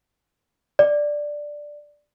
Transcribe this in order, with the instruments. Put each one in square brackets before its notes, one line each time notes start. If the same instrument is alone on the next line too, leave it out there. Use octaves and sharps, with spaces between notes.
[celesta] D5